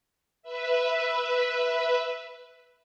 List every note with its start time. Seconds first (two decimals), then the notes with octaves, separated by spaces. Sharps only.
0.42 B4 E5